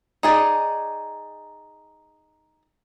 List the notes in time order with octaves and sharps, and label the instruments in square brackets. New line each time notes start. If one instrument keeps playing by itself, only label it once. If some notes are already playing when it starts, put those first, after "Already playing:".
[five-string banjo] D#4 G#4 D5